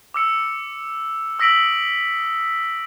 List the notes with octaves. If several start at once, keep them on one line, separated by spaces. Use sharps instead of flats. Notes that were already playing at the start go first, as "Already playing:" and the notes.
D6 E6 C#7
D#6 E6 A#6 B6 D7 F#7